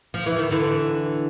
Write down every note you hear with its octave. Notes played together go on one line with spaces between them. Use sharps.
F3
E3
D#3
D3 E3